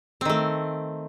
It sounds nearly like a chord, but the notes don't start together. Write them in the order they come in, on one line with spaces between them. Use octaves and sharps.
C4 D#3 A3